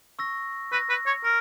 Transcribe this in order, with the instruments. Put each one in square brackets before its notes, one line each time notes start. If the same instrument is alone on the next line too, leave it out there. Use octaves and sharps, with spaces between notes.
[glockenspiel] C#6 E6 A#6
[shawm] B4 [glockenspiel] C#6 E6 A#6
[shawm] B4
C#5
[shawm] A#4 [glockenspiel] A#6